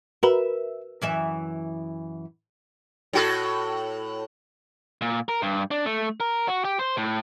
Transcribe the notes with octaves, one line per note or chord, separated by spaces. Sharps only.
F#4 A#4 B4 E5
F#2 E3 E5
A2 F#4 A4
A#2
A#4
G2
D4
A3
A#4
F#4
G4
C5
A2